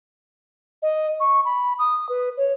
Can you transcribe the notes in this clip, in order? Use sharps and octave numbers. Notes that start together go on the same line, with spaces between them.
D#5
C#6
B5
D#6
B4
C#5